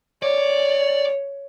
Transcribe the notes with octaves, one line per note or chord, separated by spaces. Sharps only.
C#5 D5